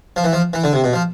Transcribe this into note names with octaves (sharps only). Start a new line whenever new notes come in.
F3
E3
F3
E3
D3
C3
B2
F3